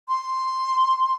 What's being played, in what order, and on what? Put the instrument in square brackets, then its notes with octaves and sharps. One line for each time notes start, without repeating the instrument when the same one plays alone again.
[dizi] C6